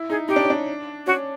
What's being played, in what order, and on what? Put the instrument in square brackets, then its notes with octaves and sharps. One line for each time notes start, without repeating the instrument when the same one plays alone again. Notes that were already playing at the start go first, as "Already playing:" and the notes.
Already playing: [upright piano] E4
[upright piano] D#4 [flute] G#4
[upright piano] D#4 [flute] G4
[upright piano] D4
C#4
D4
[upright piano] C#4 [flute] F#4